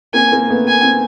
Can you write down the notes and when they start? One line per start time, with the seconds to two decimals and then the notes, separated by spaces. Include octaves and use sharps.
0.14 A#3 C4 G#5
0.31 A#3 C4
0.49 A3 B3
0.68 G#5
0.83 C4